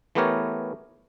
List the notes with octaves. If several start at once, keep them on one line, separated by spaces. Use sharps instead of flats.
E3 A3 B3 G4 A#4 C#5